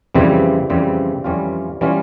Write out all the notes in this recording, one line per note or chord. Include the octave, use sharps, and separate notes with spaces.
F2 C#3 E3 G3 C4
F2 C#3 E3 G3 C4
F2 E3 G3 C#4 F4
E3 G3 C#4 F4